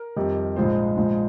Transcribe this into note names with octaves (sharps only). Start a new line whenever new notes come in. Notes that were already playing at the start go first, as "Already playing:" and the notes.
Already playing: A#4
F2 C3 D#3 G3
A#1 G#2 F3 G#3 C5
A#1 G#2 F3 G#3